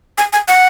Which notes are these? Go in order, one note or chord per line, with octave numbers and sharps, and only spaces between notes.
G#5
G#5
F#5